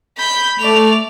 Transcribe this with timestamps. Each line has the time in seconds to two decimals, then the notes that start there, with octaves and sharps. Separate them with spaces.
0.18 B5 G6
0.60 A3 D5 F7